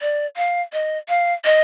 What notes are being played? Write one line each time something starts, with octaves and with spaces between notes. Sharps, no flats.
D5
F5
D#5
F5
D#5